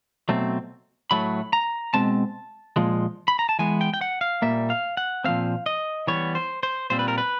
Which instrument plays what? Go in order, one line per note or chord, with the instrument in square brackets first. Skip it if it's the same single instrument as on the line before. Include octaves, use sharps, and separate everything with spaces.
[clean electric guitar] B2 F#3 A3 C4
A2 F#3 A3 B5
A#5
B2 G#3 C4 A5
A#2 F3 G#3
B5
A#5
A5
E3 G#3 B3 G#5
G5
G5
F#5
F5
A#2 G3 A#3 E5
F5
F#5
A#2 F3 A3 C4 F5
D#5
E3 G3 B3 C#5
C5
C5
A#2 G3 C4 C5
B4
A#4
B4